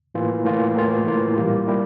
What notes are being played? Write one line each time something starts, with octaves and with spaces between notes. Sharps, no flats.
A2 E3 A#3 F4
A2 E3 A#3 F4
A2 E3 A#3 F4
A2 E3 A#3 F4
A#2 G3 A#3 E4 G4
A#2 G3 A#3 E4 G4